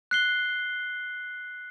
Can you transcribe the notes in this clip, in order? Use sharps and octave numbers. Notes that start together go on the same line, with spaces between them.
F#6 C7 G7